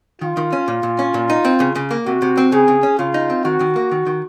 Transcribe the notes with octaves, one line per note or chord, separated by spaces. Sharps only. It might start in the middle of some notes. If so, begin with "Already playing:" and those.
D#3 F4
D#3
C#4
A#2
A#2
C#4
A#2
D#4
C4
C#3
C#3
A#3
C3 F#4
C3
C4
C#3 G#4
C#3
C#4
C#3 F4
D#4
C4
D#3 F#4
D#3
A#3
D#3
D#3